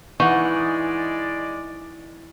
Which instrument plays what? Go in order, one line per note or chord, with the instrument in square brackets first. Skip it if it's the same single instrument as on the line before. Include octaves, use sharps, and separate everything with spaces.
[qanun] E3 [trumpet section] G#3 D5 [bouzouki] D#4 F#5 [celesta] C#6